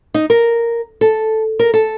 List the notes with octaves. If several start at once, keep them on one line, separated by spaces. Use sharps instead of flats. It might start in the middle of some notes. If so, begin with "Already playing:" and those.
D#4
A#4
A4
A#4
A4